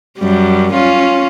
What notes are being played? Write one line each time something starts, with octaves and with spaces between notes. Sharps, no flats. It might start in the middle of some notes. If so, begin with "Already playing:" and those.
F#2 G3
C#4 F4